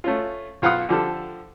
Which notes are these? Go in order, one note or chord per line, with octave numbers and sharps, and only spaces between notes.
A3 C#4 F4
B1 F4 F5 F#5 B5 D#6
D3 F3 G4 A4